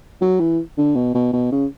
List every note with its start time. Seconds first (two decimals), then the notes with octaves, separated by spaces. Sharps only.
0.21 F#3
0.40 E3
0.78 D3
0.96 B2
1.15 B2
1.33 B2
1.52 C#3